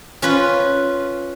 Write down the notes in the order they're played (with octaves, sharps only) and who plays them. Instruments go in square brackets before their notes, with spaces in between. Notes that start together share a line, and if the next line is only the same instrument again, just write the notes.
[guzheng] C#4 F4 B4